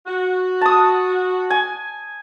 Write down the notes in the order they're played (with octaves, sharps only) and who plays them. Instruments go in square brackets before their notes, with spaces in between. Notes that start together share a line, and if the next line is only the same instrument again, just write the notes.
[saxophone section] F#4
[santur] A5 D#6
G#5